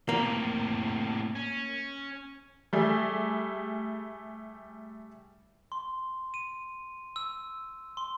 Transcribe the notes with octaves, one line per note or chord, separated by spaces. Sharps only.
A2 C3 A#3
C#4
G3 A3 G#4
C6
D#7
E6
C6